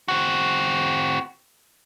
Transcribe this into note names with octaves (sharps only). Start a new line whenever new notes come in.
C4 F#4